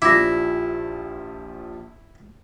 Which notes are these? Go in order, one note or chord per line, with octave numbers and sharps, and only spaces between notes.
A#1 F3 G3 E4 D6 A#6